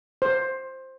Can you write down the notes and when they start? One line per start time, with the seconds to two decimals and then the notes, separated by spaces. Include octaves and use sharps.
0.22 C5